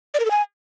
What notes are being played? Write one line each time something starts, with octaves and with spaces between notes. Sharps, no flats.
D5
A#4
A4
G#5